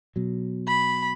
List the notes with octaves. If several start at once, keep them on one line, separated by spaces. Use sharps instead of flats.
B2 F#3
B5